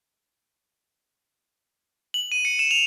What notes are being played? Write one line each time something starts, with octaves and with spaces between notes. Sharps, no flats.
F#7
D#7
C#7
E7
F7